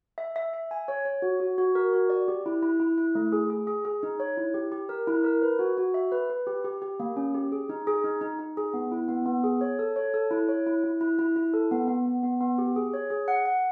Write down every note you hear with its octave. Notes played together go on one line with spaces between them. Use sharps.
E5
E5
E5
G#5
C#5
C#5
F#4
F#4
F#4
A#4
F#4
D5
G4
E4
E4
E4
E4
A3
G#4
G#4
G#4
G#4
D#4
C#5
E4
G4
G4
A#4
E4
A#4
B4
F#4
F#4
E5
B4
B4
G4
G4
G4
A#3
C#4
G4
G#4
D#4
G#4
D#4
D#4
D#4
G#4
B3
E4
B3
B3
G#4
C#5
A4
C#5
A4
E4
C#5
E4
E4
E4
E4
E4
A4
B3
B3
B3
B3
B3
G4
G#4
C#5
G#4
F#5
F#5